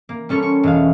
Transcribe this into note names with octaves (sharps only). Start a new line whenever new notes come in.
A#3
G3 C#4 A4 C#6
C#6
E1 F5